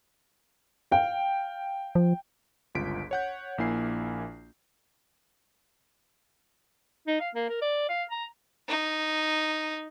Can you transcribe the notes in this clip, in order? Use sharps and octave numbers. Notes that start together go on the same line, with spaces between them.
F5 G5
F3
G1 C#2 F4 B6 D7
C#5 F#5 G6
A#1 A#3 E4 G#5 C7
D#4
F5
A#3
A#4
D5
F5
A#5
D#4